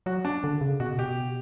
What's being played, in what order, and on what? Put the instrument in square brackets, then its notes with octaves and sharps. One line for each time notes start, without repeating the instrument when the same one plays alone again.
[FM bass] F#3 [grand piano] F#4
[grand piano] D4
[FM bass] D3
C#3
[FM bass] B2 [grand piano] F#4
[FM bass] B2 [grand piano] G4